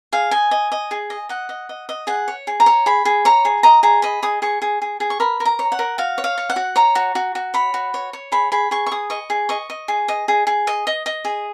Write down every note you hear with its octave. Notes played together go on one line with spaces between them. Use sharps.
G#4 F5
D#5 G#5
D#5
D#5
G#4
D#5
D#5 F#5
D#5
D#5
D#5
G#4 F#5
C#5
G#4
A#5
C#5
G#4 B5
G#4
C#5 A#5
G#4
D#5 A#5
G#4 A#5
D#5 B5
G#4 D#6
G#4 C#6
G#4
G#4
G#4
C#6
A#4 B5
A#4
A#5
C#5
F#5
A#4
F#4 F5
C#5
F5
C#5
F#5
F#4
C#5 A#5
F#4
F#4
F#4
C#5 B5
F#4
C#5
C#5
G#4 B5
G#4 B5
G#4 C#6
C#6
G#4 D#6
D#5 C#6
G#4
D#5 C#6
D#5
G#4
D#5
G#4
G#4
D#5 D#6
D#5
D#5
G#4